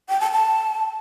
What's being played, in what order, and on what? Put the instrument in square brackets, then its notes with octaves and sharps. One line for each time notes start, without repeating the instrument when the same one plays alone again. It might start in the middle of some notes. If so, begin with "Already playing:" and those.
[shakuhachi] G5
A5
A5